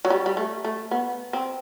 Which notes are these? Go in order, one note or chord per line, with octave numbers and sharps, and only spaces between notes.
F#3
G3
G3
A3
A3
B3
C4